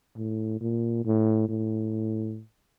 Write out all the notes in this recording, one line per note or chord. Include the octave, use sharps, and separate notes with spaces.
A2
A#2
A2
A2